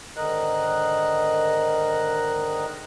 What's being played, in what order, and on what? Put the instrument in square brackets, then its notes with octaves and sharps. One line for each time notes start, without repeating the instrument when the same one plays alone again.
[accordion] G#2 D3 D#3 A#4 D#5 F#6